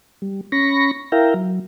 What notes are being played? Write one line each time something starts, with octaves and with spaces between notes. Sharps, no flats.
G3
C#4 B5 C#6 A#6
E4 A#4 E5 F5 G5 A#5
F#3